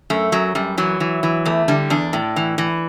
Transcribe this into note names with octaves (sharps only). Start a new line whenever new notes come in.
F#2 A3
F#2 F#3
F#2 G3
E3 F#3
E3
E3
E2 A3
D3 G3
E2 D4
A2
E3
E3